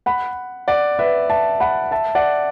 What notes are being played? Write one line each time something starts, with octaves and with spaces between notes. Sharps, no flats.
F#5 B5
D5 F#5
B4 E5
E5 A5
F#5 B5
E5 A5
D5 F#5